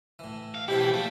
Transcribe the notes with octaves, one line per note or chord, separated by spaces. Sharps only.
A2 E3
F5
B2 E3 C4 E4 G4 A5
C#5
A#1 A3 A#3 A5